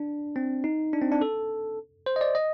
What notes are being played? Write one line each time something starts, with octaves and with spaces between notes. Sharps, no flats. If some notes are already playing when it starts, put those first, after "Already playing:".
Already playing: D4
C4
D#4
D4
C4
D4
A4
C5
D#5
D5
D#5